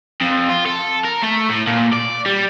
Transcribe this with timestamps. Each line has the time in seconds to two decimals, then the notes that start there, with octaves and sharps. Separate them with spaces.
0.21 F2
0.50 F4
0.66 A4
1.05 A#4
1.23 A3
1.50 A2
1.67 A#2
1.93 D5
2.26 G3